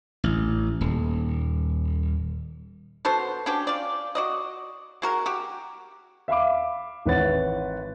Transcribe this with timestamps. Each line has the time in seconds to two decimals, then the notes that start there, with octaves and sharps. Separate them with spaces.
0.24 A1
0.81 D#1
3.05 B3 F#4 A4 C5
3.46 C#4 D4 F#4 G4
3.67 F4 D5
4.15 F#4 D5 D#5
5.02 G#3 F#4 A#4
5.26 F#4 G4
6.28 E5 F5 B5 D6
7.06 G#1 E3 B4 C#5 F#5 A6